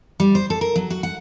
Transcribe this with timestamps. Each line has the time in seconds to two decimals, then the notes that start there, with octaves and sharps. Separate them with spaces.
0.20 G3
0.35 C5
0.50 A4
0.61 A#4
0.76 F#3
0.90 F#4
1.03 F#5